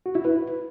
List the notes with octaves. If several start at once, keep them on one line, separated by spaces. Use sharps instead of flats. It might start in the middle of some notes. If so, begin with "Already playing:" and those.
F#4
E4
B4